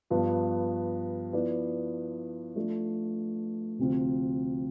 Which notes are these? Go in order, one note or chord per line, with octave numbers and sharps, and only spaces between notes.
G2 F3 B3
F3 B3 E4 B4 D5
F3 A3 D4
D2 C3 F3 C4 F4